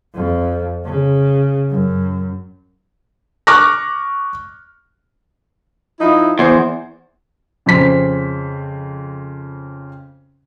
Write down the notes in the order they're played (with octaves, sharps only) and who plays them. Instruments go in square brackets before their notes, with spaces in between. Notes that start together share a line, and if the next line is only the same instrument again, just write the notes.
[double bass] F2
C#3
F#2
[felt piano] C#6 D6 F6 F#6 A#6
[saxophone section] F3 D#4 E4
[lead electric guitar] E2 [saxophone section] C5
[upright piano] F2 C#3 C5 B6